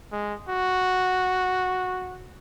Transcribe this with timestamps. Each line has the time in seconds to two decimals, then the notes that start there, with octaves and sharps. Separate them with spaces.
0.12 G#3
0.48 F#4